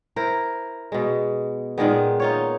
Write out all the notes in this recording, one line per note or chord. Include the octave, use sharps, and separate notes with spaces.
E4 A#4 C5
B2 G#3
A#2 D#3 G#3 B3
D#4 F4 C#5